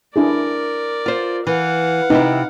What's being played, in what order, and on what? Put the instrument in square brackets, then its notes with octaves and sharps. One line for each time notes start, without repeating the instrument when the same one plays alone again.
[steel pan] D4 E4 G#4 [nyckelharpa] A#4 D5
[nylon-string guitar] F4 C5
[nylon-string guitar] E3 [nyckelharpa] F5 F#5
[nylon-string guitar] C3 C4 E4 [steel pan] D#4 B4